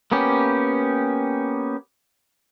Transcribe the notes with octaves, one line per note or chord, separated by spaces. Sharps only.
A#3 B3 C#4 G4